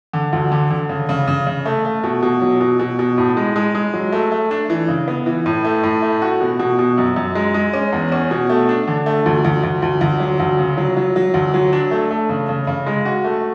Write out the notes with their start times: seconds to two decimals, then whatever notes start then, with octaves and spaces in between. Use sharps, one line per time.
0.13 D3
0.33 D2
0.52 D3
0.70 D3
0.89 C#3
1.09 C#3
1.27 C#3
1.47 C#3
1.66 A3
1.85 A3
2.04 B2
2.23 B2
2.41 F#3
2.61 B2
2.79 B2
2.99 B2
3.18 A2
3.37 G#3
3.56 G#3
3.75 G#3
3.94 F#3
4.12 A3
4.32 A3
4.51 D4
4.70 E3
4.88 C#3
5.08 B3
5.26 E3
5.46 A2
5.64 A3
5.83 A2
6.02 A3
6.22 F#4
6.40 B2
6.59 B2
6.79 B2
6.98 F#2
7.16 F#2
7.35 G#3
7.54 G#3
7.73 C#4
7.92 E2
8.12 C#4
8.31 B2
8.50 A3
8.69 D4
8.88 D3
9.06 A3
9.26 D2
9.45 D2
9.63 D2
9.82 D2
10.01 D2
10.20 F#3
10.40 D2
10.59 C#3
10.77 F#3
10.97 F#3
11.16 F#3
11.34 D2
11.54 F#3
11.73 D4
11.91 A3
12.11 A3
12.29 C#3
12.49 C#3
12.67 C#3
12.86 G#3
13.05 F#4
13.24 A3